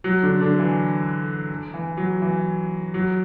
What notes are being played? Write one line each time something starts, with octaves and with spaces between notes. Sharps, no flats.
F#3
D3 D4
D3 D4
E3
E3
F#3
E3
F#3